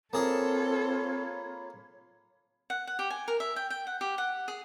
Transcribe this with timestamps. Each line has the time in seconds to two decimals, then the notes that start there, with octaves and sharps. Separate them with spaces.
0.13 A#3 C4 F4 G#4 A4 C#5 B5
2.70 F#5
2.87 F#5
2.99 G4
3.10 G#5
3.28 A#4
3.40 E5
3.56 G5
3.70 G5
3.87 F#5
4.01 G4
4.18 F#5
4.48 G#4